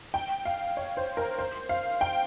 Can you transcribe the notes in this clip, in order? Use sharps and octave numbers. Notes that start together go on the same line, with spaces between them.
G5
F5
C#5
C5
A#4
C5
F5
G5